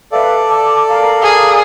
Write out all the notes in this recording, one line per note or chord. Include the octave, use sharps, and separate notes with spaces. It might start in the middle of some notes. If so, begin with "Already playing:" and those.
A4 B4 D5 E5 F5
A5 D6
A#4 F5 A#5
G#4